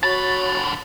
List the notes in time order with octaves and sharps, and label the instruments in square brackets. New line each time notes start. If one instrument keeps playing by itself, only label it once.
[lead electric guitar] D3 B5 [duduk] F#4 [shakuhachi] C#5 [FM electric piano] A6